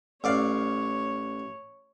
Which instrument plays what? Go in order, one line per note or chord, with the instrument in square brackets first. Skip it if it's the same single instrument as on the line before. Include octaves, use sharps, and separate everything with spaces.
[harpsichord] A1 D5 F5 [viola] C#5